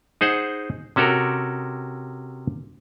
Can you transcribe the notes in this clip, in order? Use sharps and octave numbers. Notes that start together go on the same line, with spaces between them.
D#4 G#4 C5 F#5
C3 C#4 F#4 A4 A#4